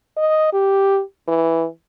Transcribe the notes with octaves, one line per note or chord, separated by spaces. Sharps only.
D#5
G4
E3